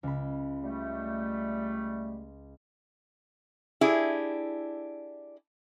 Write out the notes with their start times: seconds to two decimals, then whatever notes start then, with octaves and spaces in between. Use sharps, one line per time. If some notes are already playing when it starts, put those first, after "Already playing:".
0.03 C#2 B5
0.63 G3 A3
3.81 D4 E4 G4 G#4